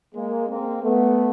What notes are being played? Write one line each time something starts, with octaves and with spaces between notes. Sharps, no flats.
G#3 A#3
A#3 C4
A3 B3